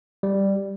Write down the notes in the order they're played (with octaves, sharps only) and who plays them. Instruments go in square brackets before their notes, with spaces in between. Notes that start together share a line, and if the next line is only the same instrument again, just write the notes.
[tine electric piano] G3